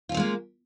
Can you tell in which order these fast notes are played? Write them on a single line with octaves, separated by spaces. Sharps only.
F4 C#4 C4 G#3 A#3